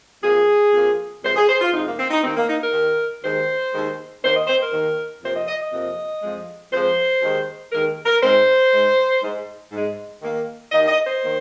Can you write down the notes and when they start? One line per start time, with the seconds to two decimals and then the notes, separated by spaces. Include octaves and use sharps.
0.23 F2 F3 A#3 G#4
0.73 F2 F3 A#3
1.23 F2 C3 G#3 C5
1.36 G#4
1.48 C5
1.61 F4
1.73 F2 C3 G#3 D#4
1.85 A#3
1.99 C4
2.11 D#4
2.24 D#2 D#3 A#3 C4
2.36 A#3
2.49 D#4
2.61 A#4
2.73 D#2 D#3 A#3
3.23 D#2 D#3 G#3 C5
3.73 D#2 D#3 G#3
4.23 D#2 D#3 A#3 C5
4.35 D#5
4.47 C5
4.60 A#4
4.72 D#2 D#3 A#3
5.23 F2 C3 F3 A#3 C5
5.35 D#5
5.48 D#5
5.60 D#5
5.73 F2 C3 F3 A#3
6.22 F2 F3 G#3
6.72 F2 F3 G#3 C5
7.22 D#2 D#3 G#3
7.72 D#2 D#3 G#3 A#4
8.06 A#4
8.22 G#2 G#3 C5
8.73 G#2 G#3
9.23 G#2 G#3
9.72 G#2 G#3
10.22 D#2 D#3 A#3
10.72 D#2 D#3 A#3 D#5
10.88 D#5
11.05 C5
11.22 D#3 A#3